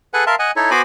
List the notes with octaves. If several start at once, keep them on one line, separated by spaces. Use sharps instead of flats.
G#4 A4 B4 F#5 G#5
A#4 E5 F5 A5 C6
D#5 F#5 G#5
D#4 E4 A4 C#5
B3 F#4 C5 G#5 B5 D6